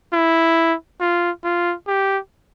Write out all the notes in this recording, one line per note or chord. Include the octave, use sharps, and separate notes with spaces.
E4
F4
F4
G4